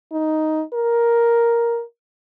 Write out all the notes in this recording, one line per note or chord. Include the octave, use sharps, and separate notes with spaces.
D#4
A#4